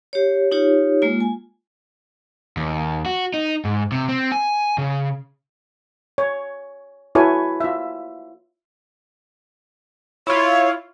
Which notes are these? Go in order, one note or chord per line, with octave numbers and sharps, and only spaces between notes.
G4 C#5
D#4 F4 G4 C#5
G#3 A#3 F4
G#5
D#2
F#4
D#4
G#2
C3
C4
G#5
C#3
C#5
E4 F#4 A4 B4 C#5 G#5
F4 E5
E4 F4 C#5